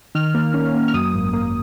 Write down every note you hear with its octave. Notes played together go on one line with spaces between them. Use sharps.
D#3 F6
A#3
C#4
A#3
F6
F#2 D#6
G#1
A#3